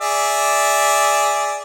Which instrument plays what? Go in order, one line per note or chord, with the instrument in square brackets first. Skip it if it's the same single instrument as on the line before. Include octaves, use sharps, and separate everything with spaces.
[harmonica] G#4 D5 E5